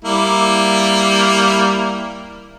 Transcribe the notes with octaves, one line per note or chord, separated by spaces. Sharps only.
G3 A#3 E4